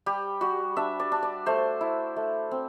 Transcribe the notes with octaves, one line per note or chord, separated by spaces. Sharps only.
G3 G4
G3 F#4
D4 E5
D5
D4
D5
A3 C5
E4
A3
C4